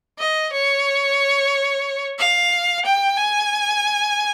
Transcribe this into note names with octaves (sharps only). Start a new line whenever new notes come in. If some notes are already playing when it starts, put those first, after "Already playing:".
D#5
C#5
F5
G5
G#5